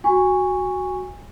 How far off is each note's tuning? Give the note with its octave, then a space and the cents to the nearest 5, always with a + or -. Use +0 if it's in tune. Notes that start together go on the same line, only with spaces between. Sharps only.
F#4 +0 G#5 -20 C#6 +0